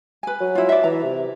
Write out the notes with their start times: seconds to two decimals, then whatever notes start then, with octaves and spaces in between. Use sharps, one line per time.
0.23 B4 G#5
0.41 F#3
0.55 E4 F4
0.69 D5 E5
0.84 E3 A#5
1.04 C3